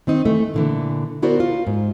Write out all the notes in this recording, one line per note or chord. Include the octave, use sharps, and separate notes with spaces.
D#3 C4 D#4
D#3 E3 A3
A#2 D3 E3
B3 E4 F#4 A#4 C5 D5
F4
G#2